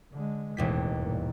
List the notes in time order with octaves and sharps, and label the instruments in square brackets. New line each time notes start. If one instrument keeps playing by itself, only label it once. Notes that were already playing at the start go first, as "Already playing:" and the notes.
[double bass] D3 G#3
[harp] E1 D#2 B6 [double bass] A1
[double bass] G2 A#2